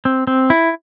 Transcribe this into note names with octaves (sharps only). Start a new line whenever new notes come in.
C4
C4
E4